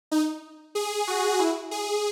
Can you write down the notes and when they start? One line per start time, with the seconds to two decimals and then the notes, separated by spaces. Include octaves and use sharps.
0.11 D#4
0.75 G#4
1.07 F#4
1.39 E4
1.71 G#4